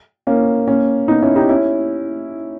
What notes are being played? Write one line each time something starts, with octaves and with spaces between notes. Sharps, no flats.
A#3 C#4
A#3 C#4
B3 D#4
C#4 E4
D#4 G4
C#4 E4